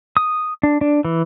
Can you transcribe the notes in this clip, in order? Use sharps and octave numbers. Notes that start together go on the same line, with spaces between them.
D#6
D4
D4
E3